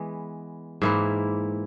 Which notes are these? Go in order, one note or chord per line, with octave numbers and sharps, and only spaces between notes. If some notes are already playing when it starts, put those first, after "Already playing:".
Already playing: E3 G#3 B3
G#2 E3 A#3 E4